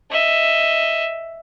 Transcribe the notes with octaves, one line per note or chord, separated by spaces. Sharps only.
D#5 E5